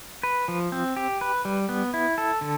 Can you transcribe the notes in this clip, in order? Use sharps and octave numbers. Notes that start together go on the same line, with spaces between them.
B4
F3
C4
G4
B4
G3
B3
E4
A4
D3